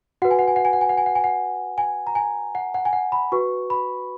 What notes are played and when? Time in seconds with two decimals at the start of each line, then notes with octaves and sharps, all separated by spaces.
0.22 F#4 B4 F#5
0.31 G#5
0.39 F#5
0.48 G#5
0.56 F#5
0.65 G#5
0.73 F#5
0.81 G#5
0.89 F#5
0.97 G#5
1.06 F#5
1.15 G#5
1.24 F#5
1.78 G#5
2.07 A#5
2.15 G#5
2.55 F#5
2.74 F#5
2.85 G#5
2.93 F#5
3.12 B5
3.32 F#4 B4 C#6
3.70 B5